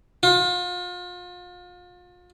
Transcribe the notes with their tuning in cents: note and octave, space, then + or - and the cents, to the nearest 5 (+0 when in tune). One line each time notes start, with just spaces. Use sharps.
F4 +35